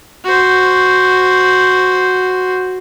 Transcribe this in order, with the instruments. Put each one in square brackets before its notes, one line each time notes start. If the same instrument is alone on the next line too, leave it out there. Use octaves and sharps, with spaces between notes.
[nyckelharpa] F#4 C5